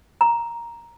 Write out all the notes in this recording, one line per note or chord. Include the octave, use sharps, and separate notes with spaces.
A#5